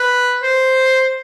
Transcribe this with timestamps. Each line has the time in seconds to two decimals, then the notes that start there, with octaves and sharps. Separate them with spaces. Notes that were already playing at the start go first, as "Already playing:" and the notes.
Already playing: B4
0.43 C5